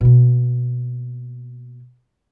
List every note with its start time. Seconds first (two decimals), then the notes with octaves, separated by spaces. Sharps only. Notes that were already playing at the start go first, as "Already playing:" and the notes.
0.01 B2 A#3